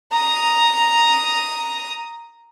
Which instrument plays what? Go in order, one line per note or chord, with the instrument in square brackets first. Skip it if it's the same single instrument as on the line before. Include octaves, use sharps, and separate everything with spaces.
[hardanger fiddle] A#5 D#6